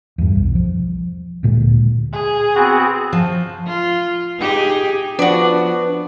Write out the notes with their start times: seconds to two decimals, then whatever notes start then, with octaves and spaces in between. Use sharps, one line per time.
0.18 E2 G2
0.36 B1
0.55 F3
1.43 D2 A#2 G#3
2.13 G#4
2.55 B3 C4 F#4
3.13 F3
3.67 F4
4.39 D#4 G4 G#4
5.19 F3 B3 D4 F#4 D5